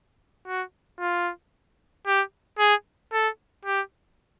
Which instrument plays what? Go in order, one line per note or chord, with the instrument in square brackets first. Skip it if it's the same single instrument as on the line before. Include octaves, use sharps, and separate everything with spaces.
[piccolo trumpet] F#4
F4
G4
G#4
A4
G4